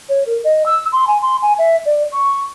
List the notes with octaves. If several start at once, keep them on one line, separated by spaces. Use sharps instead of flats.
C#5
A#4
D#5
E6
C6
G#5
C6
G#5
E5
D5
C#6